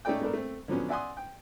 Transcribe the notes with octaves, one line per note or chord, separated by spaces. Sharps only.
A3 C#4 D#4 A4 D5 G5
A3 B3 D4 A4 A#4
A3 C4
D3 F3 F#3 B3 C#4
D5 E5 F#5 G#5 C6 D#6
G5